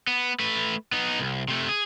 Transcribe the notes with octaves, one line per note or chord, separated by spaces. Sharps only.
B3
A3 B4
B3 D#4
C2
C3 A3
G#4